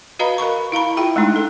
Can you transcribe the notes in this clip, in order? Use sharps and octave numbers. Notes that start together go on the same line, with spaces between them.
F#4 B4 D#5 F5 A#5 B5
A#4 F5 B5 C#6
E4 F5 A#5 B5
E4 F4 G#4 E5 G5
G#3 A3 D4 D#4
A4